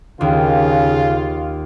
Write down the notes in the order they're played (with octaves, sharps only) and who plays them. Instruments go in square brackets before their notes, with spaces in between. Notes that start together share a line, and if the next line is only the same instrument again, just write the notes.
[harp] D#2 [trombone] C#3 [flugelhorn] F4